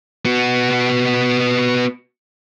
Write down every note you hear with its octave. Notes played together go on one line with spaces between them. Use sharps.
B3 F#4